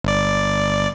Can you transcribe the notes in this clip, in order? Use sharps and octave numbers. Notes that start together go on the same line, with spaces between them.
G1 D5